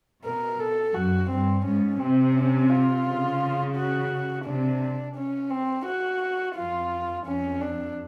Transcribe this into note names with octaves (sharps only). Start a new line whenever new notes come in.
B2 A#4
A4
F#2 F#4
G2 C4
G#2 C#4
C3 C4
C#4
F4
C#3
F#4
C3 D4
C#4
C4
F#4
F2 F4
F2 C#4
D4